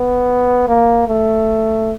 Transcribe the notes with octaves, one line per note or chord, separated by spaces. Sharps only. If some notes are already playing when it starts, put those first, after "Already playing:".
Already playing: B3
A#3
A3